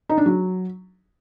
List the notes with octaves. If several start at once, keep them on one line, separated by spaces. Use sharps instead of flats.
D#4
D4
F#3